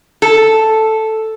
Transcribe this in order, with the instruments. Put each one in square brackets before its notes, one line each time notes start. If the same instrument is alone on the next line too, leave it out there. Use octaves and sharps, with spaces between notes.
[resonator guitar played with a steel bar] A4